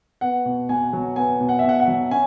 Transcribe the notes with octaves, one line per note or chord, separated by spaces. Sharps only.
B3 F#5
B2
B2 G#5
F#3
B3 G#5
B2
F#5
B2 E5
F#5
F#5
F#3
C#4 G#5